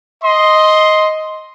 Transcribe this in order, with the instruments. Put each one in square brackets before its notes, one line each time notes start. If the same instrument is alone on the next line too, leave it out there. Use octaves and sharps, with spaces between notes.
[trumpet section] D#5 C6